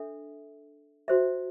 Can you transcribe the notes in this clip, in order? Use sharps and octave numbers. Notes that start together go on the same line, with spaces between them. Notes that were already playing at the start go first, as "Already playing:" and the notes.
Already playing: D4 A4 E5
F#4 C5 E5